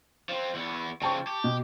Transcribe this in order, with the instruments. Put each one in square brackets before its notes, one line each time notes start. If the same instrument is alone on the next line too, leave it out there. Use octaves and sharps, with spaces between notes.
[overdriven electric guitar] F3 C4
E2 B3
[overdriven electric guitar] C#3 F3 [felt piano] G5 A5 C#6
[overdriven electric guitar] G4
[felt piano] B2